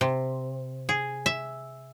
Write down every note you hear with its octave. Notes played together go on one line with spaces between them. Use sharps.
C3
G#4
E5